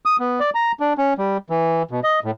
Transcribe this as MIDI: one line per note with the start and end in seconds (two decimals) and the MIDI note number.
0.05 0.16 87
0.20 0.40 59
0.40 0.50 74
0.55 0.72 82
0.80 0.93 62
0.98 1.14 61
1.18 1.37 55
1.50 1.83 52
1.91 2.00 47
2.03 2.20 75
2.24 2.31 45